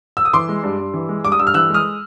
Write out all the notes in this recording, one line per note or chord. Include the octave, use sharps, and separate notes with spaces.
E6
D#6
E3 C6 D6
G#3
G2
G2
E3
G#3
G2 D6
D#6
G2 E6
F6
E3 E6 F#6
G#3 D#6 F6